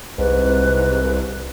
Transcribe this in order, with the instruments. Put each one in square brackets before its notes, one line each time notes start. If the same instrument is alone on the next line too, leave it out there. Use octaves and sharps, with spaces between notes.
[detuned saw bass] C2 [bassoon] G#2 [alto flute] B4